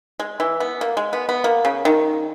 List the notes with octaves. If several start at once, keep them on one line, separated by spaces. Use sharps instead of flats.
G#3
E3
B3
A#3
G#3
B3
B3
A#3
C#3
D#3